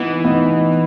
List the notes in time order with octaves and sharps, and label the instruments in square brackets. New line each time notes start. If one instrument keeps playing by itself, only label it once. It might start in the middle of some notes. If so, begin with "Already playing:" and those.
Already playing: [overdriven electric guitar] E3 [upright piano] B3 D#4
[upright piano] B3 D#4